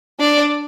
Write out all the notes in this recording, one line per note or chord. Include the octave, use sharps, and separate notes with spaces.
D4 D5